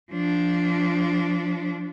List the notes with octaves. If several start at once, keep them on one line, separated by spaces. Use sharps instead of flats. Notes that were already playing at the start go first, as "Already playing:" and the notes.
F3 D4